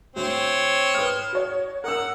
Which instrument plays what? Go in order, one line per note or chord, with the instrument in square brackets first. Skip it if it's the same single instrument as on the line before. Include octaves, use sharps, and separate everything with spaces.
[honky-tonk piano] D2 F#4 [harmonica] C4 C#5
[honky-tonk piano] B4 D#6 F6
F#4 C#5
[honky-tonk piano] A#4 D#6 E6 [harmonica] F#5